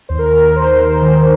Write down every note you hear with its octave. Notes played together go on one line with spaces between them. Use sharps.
D#2 C5
A#4
D#2 A#4
D#2 C5
A#4
D#2
C5
D#3 C5